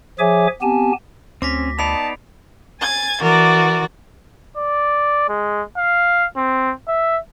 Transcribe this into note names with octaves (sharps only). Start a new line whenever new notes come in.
F3 G#4 C#5 E5 G#5 D6
B3 C4 G4 G#5 A5
D2 C4 C#4 D6 A#6 B6
B3 D#4 D5 A5 B5 C7 F7
G#5 G#6 A6
E3 F#4 A#4 D5
D5
G#3
F5
C4
E5